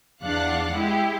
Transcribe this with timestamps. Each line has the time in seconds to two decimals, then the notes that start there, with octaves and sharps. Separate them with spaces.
0.23 E2 D4 F5 F#5 F#6
0.73 G#3 E4 G4